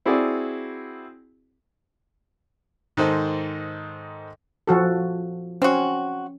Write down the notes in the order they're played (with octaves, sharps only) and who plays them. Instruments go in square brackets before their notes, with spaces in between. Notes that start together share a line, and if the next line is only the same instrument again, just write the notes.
[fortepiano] C4 E4 F#4 G#4 D5
G#2 D#3 A4 C5 D#5
[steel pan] F3 F#4 A4
[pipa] C4 F#4 [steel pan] C#4